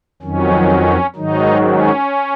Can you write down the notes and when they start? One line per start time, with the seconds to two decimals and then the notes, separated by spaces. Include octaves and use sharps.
0.22 F2 D#3 F#3 C#4
1.15 G#2 D#3 F#3 D#4
1.62 C#4